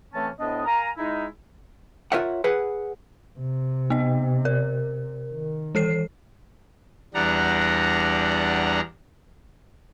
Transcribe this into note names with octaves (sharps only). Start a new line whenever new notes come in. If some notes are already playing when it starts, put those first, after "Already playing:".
A2 E3 A3 C4 C#4 A5
D2 A2 B3 D4 D#5
A#4 F5 G#5 A#5
G#3 D#4 E4
F4 A#4 C#5 E5 F#5
G#4 B4 F#5
C3
B3 D#5
A#4
D#3
E3 A4 C7
E2 G3 D4 F#5 A#5